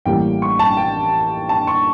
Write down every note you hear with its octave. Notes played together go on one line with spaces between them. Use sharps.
A1 A2 G3 A#3 G5
C#6
A5
G5
A5
C#6